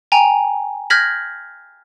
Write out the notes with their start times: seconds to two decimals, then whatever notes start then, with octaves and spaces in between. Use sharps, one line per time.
0.12 G5 G#5 A#5
0.90 F6 G6 G#6 A#6 B6 F#7